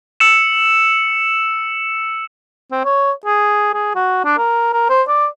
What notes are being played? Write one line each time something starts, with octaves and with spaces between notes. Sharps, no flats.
E6 C#7 E7
C4
C#5
G#4
G#4
F#4
D4
A#4
A#4
C5
D5